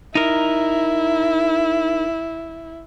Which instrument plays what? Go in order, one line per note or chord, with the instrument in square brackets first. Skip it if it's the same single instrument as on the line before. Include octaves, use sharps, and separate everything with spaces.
[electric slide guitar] D#4 A#4 [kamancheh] E4